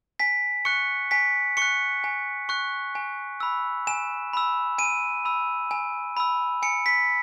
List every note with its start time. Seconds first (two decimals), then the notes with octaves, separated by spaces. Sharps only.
0.19 G#5 B6
0.65 C#6 F#6 C#7
1.11 G#5 B6
1.57 C#6 F#6 C#7
2.04 G#5
2.49 C#6 F#6
2.95 G#5
3.40 B5 E6
3.87 G#5 E7
4.33 B5 E6
4.78 G#5 D#7
5.25 B5 E6
5.71 G#5
6.17 B5 E6
6.63 G#5 C#7
6.86 B6